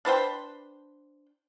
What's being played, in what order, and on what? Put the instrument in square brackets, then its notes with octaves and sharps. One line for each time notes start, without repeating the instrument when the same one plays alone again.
[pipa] D4 B4 C5 G5